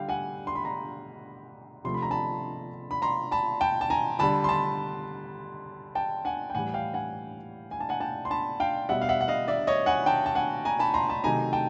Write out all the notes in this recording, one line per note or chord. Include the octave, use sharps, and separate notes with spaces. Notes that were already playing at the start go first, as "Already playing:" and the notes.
Already playing: D3 G3 F5 G5
F#5 G#5
C6
B5
A#5 C6
C3 F3 A3 C6
B5
A#5
A5 B5
B5
A#5 C6
A5 B5
G5 A5
A5
G#5 A#5
D3 G3 A5 B5
C6
A5 B5
G5 A5
F#5 G#5
G5
A2 E3 G3 F#5 G#5
F5 G5
F#5 G#5
G#5
A5
F#5 G#5
G5 A5
C6
A5 B5
F5 G5
B2 G3 E5 F#5
F5
E5 F#5
F#5
D#5 F5
D5 E5
C#5 D#5
F#5 G#5
G5 A5
A5
F#5 G#5
G#5 A#5
A5 B5
A#5 C6
A5 B5
C3 D#3 F#3 A3 G#5 A#5
G5 A5